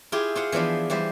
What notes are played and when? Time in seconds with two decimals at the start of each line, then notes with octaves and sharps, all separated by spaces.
0.12 E4 F4 G4 G#4
0.35 F4 C5 F#5
0.52 E3 F3 B3 D4 C5
0.90 E3 G3 G4 C5